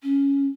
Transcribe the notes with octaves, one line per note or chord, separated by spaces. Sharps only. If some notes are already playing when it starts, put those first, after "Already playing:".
C#4